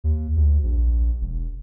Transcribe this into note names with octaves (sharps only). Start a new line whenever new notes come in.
D#2
D2
A#1
E1